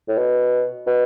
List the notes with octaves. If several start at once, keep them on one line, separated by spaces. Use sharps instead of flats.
A2
B2
B2